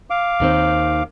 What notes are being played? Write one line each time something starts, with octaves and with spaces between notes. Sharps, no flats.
F5 D6
D#2 D#3 C4